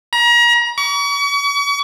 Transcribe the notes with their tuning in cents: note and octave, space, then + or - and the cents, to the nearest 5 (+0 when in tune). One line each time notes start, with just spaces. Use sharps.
A#5 +35
C#6 +40